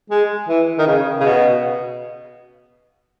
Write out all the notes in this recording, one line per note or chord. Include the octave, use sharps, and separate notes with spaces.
G#3
E3
D#3
C#3
C#3
B2